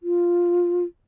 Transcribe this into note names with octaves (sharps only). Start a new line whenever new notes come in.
F4